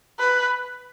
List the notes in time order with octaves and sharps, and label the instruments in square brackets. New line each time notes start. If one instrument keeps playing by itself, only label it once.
[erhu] B4